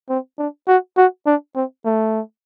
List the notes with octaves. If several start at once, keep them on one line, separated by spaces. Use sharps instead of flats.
C4
D4
F#4
F#4
D4
C4
A3